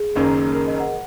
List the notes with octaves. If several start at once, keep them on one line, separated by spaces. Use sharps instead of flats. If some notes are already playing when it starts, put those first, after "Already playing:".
Already playing: G#4
F#1 F#2 D#3 A#3 C#4
A#4
D#5
F#5